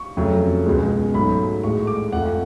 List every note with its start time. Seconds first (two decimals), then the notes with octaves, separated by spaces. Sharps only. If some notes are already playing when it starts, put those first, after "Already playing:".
Already playing: C#6
0.17 F2 C#3 F#3 A3
0.66 C#2 B2 G#3
1.14 G#2 F#3 A3 B5
1.63 A2 G#3 C#6
1.87 D6
2.12 F2 F3 A3 F#5